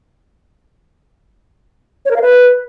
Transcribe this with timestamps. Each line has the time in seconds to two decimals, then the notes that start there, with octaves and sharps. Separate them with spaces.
2.05 C#5
2.11 A#4
2.16 F5
2.22 B4